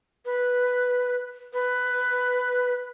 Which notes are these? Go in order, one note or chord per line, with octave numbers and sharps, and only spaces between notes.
B4
B4